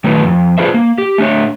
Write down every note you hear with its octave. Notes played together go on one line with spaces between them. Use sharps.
D#3 F#3 A3 E4 B4
F2
D4 F4 G#4 B4 C5 E5
A#3
G4
A3 D4 C#5